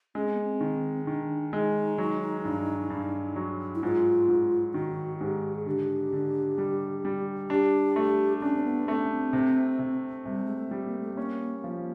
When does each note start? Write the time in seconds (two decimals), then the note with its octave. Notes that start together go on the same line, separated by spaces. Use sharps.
0.15 G#3 C#4
0.25 C4
0.33 B3
0.43 C4
0.61 D#3
1.06 D#3 D4
1.53 G#3 D#4
1.98 F#3
2.45 G2
2.90 G2
3.36 F#3
3.75 E4
3.83 G#2 F4
4.28 G#2
4.74 D#3 F#4
5.20 G#2 G4
5.56 G#4
5.66 D3 G4
6.13 D3
6.58 G3
7.05 G3
7.50 D4 G4
7.96 A3
8.42 C#4 D4
8.56 C4
8.64 B3
8.88 A3 C4
8.99 C#4
9.10 C4
9.33 C3
9.79 C3
10.26 C3 G3
10.44 G#3
10.56 A3
10.71 G3
10.86 A#3
11.00 A3
11.14 A#3 C#4
11.64 F3